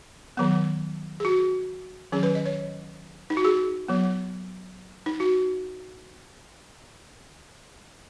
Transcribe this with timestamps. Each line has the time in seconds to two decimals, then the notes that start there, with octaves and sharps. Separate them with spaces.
0.37 D#3 F#3 B3
1.20 G#4
1.25 F#4
2.12 D#3 F#3 C#4 G#4
2.23 B4
2.35 D#5
2.46 C#5
3.30 D#4
3.37 F#4
3.45 G#4
3.88 F#3 B3
5.06 D#4
5.20 F#4